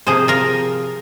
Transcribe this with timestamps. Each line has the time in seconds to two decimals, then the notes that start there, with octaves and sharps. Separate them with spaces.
0.07 C3 F3 A#3 G#4 C5
0.28 F4 A#4